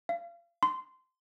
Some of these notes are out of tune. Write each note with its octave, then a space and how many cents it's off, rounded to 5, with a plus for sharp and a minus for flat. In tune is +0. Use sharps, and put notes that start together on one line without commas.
F5 -30
C6 -15